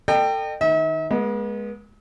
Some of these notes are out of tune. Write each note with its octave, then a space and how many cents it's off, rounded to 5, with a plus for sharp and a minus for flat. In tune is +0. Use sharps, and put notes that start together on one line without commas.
A4 +30 D#5 -40 G5 +0
D#3 +0 E5 -45
G#3 +5 B3 -40